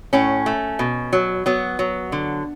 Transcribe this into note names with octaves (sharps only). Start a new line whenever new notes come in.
A2 C#4
A3
B2
F#3
F#3 B3
F#3
D3